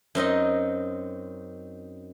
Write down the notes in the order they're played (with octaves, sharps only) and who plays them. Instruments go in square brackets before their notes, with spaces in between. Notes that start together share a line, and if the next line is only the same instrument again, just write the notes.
[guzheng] F#2 C4 D#4 D#5